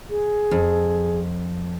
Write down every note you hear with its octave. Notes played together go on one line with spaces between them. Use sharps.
G#4
F2